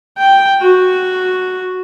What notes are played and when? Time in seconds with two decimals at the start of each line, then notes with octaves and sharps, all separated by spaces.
0.18 G5
0.62 F#4